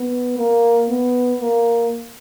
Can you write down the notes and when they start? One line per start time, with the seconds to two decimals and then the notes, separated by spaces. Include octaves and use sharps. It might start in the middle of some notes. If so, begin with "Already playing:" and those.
Already playing: B3
0.38 A#3
0.89 B3
1.41 A#3